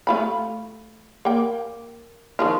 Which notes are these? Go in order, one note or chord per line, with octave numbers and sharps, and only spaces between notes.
A3 F4 B5
A#3 G5
D#3 F3 F4